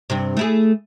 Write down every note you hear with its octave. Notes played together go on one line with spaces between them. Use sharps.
G2 C3
A3 E4 G#4